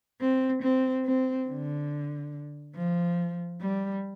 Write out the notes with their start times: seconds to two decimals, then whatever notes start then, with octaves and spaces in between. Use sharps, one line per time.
0.20 C4
0.62 C4
1.05 C4
1.48 D3
2.75 F3
3.61 G3